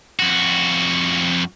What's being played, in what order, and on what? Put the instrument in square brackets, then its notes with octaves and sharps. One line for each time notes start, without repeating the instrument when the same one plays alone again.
[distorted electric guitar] F2 F#4